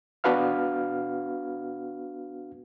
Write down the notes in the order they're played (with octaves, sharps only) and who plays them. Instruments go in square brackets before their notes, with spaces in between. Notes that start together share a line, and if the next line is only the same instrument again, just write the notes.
[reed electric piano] B3 D4 F#4 B4 F5 F6